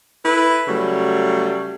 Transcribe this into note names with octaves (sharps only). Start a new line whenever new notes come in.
E4 A4 B4
C#3 F#3 G3 A3